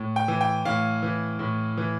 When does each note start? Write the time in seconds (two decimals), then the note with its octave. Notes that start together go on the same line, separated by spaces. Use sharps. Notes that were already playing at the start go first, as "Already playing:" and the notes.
Already playing: A2
0.16 G5
0.28 E3
0.41 G5
0.65 A2 F5
1.03 E3
1.39 A2
1.77 E3